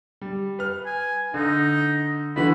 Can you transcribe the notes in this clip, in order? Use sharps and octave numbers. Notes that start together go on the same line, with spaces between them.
G3
B4 F6
G#5
D3 D#4
D3 E3 F#4 B5